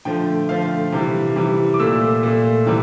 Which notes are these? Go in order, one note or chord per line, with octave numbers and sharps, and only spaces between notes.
D3 F3 A3 G5
D3 F3 A3 F5
C3 E3 G3
C3 E3 G3
D6
A#2 A3 E6
A#2 A3
C3 E3 G3